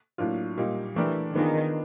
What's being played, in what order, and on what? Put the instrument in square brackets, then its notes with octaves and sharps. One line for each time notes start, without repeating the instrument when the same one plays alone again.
[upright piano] A2 F#3 A#3 D4 F4
A#2 G3 A#3 D#4
[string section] E3 [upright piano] A3 D4 G4 A#4 D5
[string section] D#3 [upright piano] B3 D4 F4 G#4